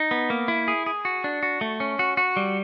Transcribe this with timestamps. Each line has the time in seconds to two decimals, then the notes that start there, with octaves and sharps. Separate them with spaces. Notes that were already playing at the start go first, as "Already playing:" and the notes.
Already playing: D#4
0.11 B3
0.30 A#3
0.48 E4
0.68 G#4
0.86 G#4
1.05 F#4
1.24 D4
1.43 F#4
1.61 A3
1.80 C#4
1.99 F#4
2.17 F#4
2.36 G3